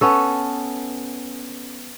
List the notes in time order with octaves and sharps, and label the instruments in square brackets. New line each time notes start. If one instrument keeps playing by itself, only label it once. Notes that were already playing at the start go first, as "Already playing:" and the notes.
[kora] B3 C#4 A4